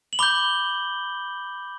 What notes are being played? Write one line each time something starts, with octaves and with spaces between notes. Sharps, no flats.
F#7
B5 D6 G6 G7